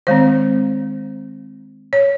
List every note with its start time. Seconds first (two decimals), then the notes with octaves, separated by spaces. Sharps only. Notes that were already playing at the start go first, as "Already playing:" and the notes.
0.07 D#3 G#3 C4 C5
1.93 C#5